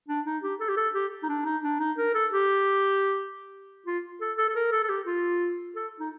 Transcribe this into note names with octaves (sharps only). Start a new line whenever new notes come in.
D4
D#4
G4
A4
G4
A4
G4
D#4
D4
D#4
D4
D#4
A#4
A4
G4
F4
A4
A4
A4
A#4
A4
A4
G4
F4
A4
D#4